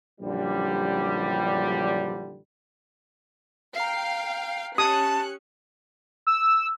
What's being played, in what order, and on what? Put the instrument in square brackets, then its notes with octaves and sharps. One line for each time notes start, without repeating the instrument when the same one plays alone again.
[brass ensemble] A#1 F#2 D3 E3 G3
[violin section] F5 G5 [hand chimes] A#5 C7
[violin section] C#4 F#6 C#7 [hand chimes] G4 [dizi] A5 [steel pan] D#6
[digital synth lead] E6